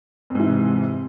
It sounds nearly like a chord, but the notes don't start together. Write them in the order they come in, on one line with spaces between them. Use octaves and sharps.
F2 G#2 E3 C3